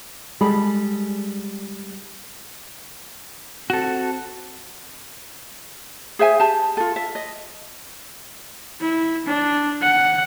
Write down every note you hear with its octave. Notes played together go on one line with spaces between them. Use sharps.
G3 G#3 G#4 A4 G5 B5
C4 F#4 A4
G#4 C5 E5 G#5
G4 A5
F4 A4
E5
D#5
E4
D4
F#5